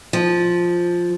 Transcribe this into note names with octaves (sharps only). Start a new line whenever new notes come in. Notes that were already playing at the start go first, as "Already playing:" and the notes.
F3